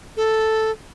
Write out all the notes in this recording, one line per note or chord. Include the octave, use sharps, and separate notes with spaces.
A4